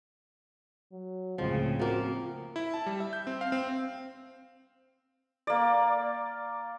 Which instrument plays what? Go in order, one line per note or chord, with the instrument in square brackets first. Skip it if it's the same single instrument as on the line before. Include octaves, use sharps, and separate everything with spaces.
[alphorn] F#3
[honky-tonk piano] C#2 G#3 [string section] A2 C#3 [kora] F3 [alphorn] C4
[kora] F3 A#3 [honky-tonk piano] F#4
[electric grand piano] E4
A5
G3
E5
G6
C4
F5
C4
[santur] A#3 D5